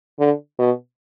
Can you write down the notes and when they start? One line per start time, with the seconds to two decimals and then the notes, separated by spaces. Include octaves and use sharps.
0.19 D3
0.59 B2